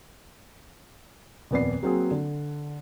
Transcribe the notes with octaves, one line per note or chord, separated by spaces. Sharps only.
D#1 F2 B3 D5 C7
F#3 A#3 C4 F#4 G#4
D3